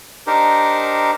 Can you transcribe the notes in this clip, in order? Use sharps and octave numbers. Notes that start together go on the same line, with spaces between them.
D4 D#4 G4 A#4 C5